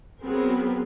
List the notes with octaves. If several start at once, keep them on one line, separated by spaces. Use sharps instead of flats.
F#3 B3 C4 G#4 A#4